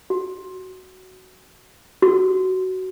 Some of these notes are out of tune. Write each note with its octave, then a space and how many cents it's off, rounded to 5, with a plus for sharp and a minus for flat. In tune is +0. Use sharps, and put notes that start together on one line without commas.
F#4 +10
F#4 +15